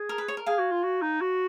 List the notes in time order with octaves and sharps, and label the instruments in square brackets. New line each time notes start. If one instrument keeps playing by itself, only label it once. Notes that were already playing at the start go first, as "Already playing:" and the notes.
Already playing: [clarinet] G#4
[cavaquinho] A#4
B4
C#5
A#4
[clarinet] G#4 [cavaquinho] F5 G#5
[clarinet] F#4
F4
F#4
D#4
F#4